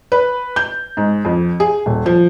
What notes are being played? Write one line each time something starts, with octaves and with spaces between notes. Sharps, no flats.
B4
G6
G#2
F2
G#4
D#1
F3